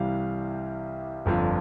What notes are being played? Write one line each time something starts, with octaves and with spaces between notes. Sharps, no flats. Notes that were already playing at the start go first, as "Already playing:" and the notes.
Already playing: C2 C3 E3 G3 F5
G1 F2 D3 F3